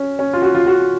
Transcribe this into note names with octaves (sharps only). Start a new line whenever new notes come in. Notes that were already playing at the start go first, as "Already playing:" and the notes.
Already playing: C#4
C#4
F4
F#4
F4
F#4